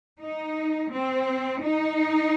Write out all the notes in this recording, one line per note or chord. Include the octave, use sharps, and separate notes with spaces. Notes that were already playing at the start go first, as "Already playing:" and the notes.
D#4
C4
D#4